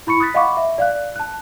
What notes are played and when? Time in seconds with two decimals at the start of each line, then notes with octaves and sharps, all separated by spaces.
0.07 E4 B5 C#6 C#7
0.20 D#6 F#6 A6 B6
0.34 D#5 F5 F#5 B5 C#6 D6
0.57 E5
0.78 D5 F5 F#6
1.16 A5 F#6